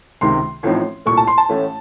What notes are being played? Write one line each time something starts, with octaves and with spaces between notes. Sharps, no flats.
C#2 C3 D#3 C6
A1 A2 F3 C4 D#4
C2 A#2 A3 C#6
A5
C6
A5
A1 A2 A3 C#4